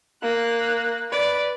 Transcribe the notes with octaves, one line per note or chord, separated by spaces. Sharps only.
A#3 F#6
B4 D5